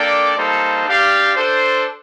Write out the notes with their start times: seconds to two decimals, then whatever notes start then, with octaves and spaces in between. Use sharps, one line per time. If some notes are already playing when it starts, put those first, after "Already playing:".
Already playing: A#3 D4 A4 D5 G5
0.36 G3 A#3 D#4 A4 C5
0.86 D4 G4 D5 F5
1.35 D4 A4 C5